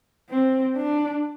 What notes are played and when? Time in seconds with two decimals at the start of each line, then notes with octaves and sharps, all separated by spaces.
0.30 C4
0.76 D4